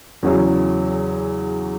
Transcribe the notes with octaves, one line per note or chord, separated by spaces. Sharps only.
E2 C#3 F#3 C#4 E4